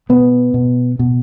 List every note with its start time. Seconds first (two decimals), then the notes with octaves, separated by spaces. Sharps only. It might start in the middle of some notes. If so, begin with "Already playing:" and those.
0.09 B2 B3
0.54 B2
0.99 B2